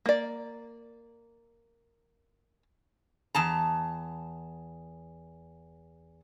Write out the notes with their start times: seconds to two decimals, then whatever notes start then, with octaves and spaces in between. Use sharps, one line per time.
0.06 A#3 D5
3.35 E2 A5 A#5